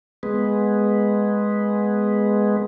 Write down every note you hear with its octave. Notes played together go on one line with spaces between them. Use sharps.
G#3 B3